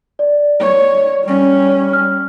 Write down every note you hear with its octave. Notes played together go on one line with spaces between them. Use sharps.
D5
C#5
G3 C#4
F6